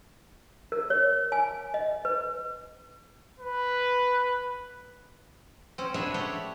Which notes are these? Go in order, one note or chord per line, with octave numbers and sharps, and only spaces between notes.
A#4
C#5
G#5
D#5
B4
B4
C4 C#4
D4 F#4 G#4 B4 C#5 E5
A3 G4 C#5 F#5